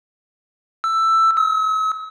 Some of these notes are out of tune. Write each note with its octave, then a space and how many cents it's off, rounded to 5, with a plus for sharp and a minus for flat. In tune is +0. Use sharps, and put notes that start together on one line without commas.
E6 +10
E6 -45